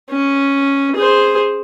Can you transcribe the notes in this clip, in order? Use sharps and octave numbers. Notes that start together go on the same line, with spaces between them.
C#4
G#4 C5